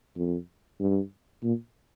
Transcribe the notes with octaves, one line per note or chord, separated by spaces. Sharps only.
F2
G2
A#2